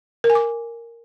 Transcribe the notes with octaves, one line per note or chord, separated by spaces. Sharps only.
A#4
G#5
D6